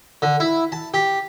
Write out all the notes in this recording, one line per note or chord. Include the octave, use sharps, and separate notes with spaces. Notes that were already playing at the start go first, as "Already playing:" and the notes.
D3
E4
A5
G4